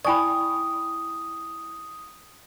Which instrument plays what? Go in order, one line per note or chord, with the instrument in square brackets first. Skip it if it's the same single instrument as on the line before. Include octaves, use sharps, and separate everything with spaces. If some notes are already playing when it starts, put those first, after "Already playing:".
[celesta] E4 G5 C#6 [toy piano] D5 G#5 B5 [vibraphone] D#6